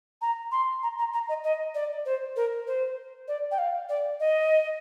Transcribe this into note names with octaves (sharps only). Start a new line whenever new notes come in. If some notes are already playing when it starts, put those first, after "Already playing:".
A#5
C6
A#5
A#5
A#5
D#5
D#5
D5
C5
A#4
C5
D5
G5
F5
D5
D#5